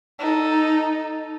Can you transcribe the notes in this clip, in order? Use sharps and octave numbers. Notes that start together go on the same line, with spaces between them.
D#4 A4